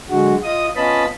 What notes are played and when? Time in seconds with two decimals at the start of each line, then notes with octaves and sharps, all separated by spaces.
0.10 D3 F#3 G#3 F#4
0.44 F4 D#5 D#6
0.76 B3 C#4 F4 D#5 A5 B5